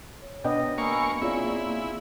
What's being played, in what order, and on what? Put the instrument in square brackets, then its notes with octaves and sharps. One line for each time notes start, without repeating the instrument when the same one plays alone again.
[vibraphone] C#5
[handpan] B2 D#5 [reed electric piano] B3 D4 G5
[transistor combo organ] A#3 C#6 [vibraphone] G#5 B5 E6
[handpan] C4 F4 G#4 [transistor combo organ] E4 [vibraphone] C#5 D5
[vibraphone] A#3